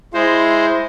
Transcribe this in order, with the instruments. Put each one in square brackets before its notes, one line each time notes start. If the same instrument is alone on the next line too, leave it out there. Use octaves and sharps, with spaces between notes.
[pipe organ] G#3 C5 [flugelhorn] E4